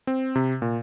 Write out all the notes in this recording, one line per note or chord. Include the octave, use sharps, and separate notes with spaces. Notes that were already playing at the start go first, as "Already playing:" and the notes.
C4
C3
A#2